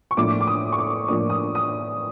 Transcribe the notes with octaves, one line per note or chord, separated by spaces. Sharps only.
C#6
A2 F3 A#3 D4 D6
D6
D#6
C#6
D6
A2 F3 A#3 D4 D#6
D#6
D#6